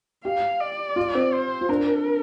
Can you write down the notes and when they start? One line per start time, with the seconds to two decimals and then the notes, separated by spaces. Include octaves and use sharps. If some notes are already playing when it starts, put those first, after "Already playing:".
0.24 G4 F5
0.60 D5
0.96 F4
1.15 C4
1.32 C5
1.61 F4
1.69 D4 A#4